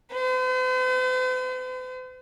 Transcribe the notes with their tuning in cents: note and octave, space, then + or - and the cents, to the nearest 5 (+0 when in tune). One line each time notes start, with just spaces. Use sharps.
C5 -45